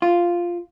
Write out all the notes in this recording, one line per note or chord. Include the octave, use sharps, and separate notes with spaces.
F4